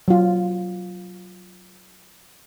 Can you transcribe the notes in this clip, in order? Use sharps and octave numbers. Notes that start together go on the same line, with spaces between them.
F#3 F4